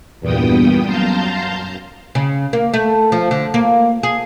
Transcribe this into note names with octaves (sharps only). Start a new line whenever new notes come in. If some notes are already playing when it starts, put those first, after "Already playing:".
E2 G2 A#2 B3 G5 D#6
F#2 F5 A5 A#5 C6 G6
C#3
A#3
A3
F3
D3
A#3
G#4